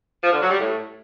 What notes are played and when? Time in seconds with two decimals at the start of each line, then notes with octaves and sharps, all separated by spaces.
0.23 F3
0.32 D3
0.41 F#3
0.50 G3
0.59 A2